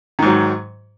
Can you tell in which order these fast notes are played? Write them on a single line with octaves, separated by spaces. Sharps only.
D#3 G#2 F#3